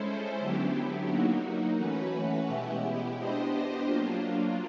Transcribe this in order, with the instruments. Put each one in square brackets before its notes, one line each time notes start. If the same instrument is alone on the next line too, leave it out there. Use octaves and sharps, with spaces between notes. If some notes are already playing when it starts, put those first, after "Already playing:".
Already playing: [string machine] G#3 C#4 E4 A4 C5
D3 F#3 B3 E4 G4
F#3 A#3 D#4 F#4
E3 A3 C#4 F#4 B4
B2 G#3 B3 E4 G4
B3 D4 G4 C5 D#5
F#3 A#3 D4 F4